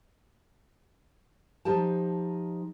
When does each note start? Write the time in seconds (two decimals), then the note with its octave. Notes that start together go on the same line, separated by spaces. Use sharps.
1.65 F3 D#4 G4 A5